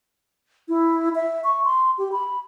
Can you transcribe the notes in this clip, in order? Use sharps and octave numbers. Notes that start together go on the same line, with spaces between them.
E4
E5
C#6
C6
G4
B5